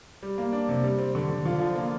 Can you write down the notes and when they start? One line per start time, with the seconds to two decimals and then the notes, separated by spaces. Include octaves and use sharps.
0.22 G3
0.38 A#3
0.53 D4
0.69 C3
0.84 G3
0.99 C4
1.15 D3
1.29 D3
1.45 D3 F4
1.60 F3
1.75 A#3 F4